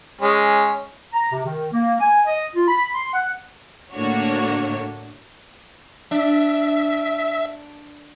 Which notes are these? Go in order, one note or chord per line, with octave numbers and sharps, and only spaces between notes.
G#3 C#4
A#5
C3
D#3
A#3
G#5
D#5
F4
B5
C6
F#5
A2 D3 A#3 D4 F#4 C#5
D4 E5